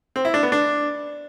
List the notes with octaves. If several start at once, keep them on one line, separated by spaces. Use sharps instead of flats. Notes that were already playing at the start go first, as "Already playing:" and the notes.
C4
E4
D4
B3
D4